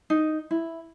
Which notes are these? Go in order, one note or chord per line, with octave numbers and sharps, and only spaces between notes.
D#4
E4